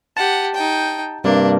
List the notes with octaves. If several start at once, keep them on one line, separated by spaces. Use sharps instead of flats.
G4 F#5 A5
D#4 G5
G2 C3 A#3 D4